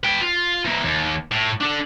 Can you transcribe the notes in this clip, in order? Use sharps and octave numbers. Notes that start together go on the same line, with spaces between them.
B4 G5
F4
E3 A#3
D#2
A2
D4 A4